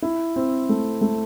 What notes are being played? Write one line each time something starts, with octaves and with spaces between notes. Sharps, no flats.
E4
C4
A3
A3